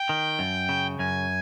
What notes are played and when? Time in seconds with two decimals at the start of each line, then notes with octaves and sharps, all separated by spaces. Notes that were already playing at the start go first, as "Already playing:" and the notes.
Already playing: G5
0.09 D#3
0.39 F#2
0.69 C#3
0.99 F#2 G#5